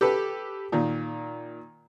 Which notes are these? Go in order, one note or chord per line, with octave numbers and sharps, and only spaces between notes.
G4 A4 B4
A#2 D#3